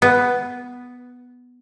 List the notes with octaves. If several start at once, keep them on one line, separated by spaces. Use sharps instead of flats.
B3